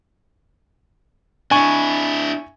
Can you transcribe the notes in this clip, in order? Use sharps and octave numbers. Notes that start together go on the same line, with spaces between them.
D4 E4 G#5 C#6